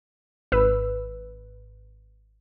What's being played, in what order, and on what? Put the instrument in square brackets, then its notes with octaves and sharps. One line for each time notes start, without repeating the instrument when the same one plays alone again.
[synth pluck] G#1 B4 E6